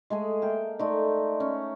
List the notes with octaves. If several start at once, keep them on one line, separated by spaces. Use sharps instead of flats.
G#3 A3 G#4
A#3 E5 G5
A3 D#4 D5 D#5 C6
C#4